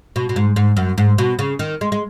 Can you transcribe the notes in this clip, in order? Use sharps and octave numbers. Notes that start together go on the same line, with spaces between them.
B2
B2
G#2
G#2
F#2
G#2
B2
C#3
D#3
G#3
G#3